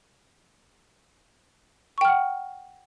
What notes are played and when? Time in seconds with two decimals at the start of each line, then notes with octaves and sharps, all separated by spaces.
1.98 C#6
2.01 G5
2.05 F6
2.08 F#5